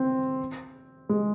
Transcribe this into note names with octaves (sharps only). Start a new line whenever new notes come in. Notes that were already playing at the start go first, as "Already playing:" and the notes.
Already playing: C4
G#3